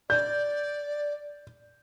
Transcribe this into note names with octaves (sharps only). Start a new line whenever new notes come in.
D5 G6